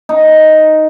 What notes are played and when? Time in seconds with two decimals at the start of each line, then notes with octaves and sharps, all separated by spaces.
0.09 D#4